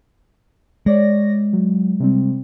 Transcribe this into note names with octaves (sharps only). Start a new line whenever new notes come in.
G#3 C#5 D5 A#6
F#3
C3 G3 C4